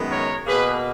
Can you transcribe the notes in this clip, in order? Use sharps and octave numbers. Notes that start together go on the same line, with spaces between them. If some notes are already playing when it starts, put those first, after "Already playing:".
Already playing: F#2 D#3 G#3 B3
A#4 C#5
B2 A#3 G#4 B4